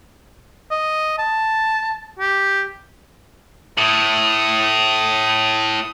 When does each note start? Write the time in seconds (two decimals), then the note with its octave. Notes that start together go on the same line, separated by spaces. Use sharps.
0.71 D#5
1.19 A5
2.19 G4
3.78 A2 D#6